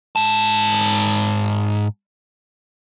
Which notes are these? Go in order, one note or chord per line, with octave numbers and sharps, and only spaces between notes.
G#2 A5